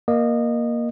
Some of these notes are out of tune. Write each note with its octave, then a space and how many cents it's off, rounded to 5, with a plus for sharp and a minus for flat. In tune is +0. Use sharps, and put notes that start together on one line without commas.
A#3 +10 D#5 -20